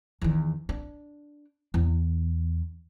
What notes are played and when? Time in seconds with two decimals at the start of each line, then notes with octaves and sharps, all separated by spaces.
0.21 E2 D#3
0.69 D4
1.74 E2